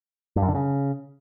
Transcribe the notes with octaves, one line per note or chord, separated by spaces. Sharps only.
G2
F#2
D3
C#3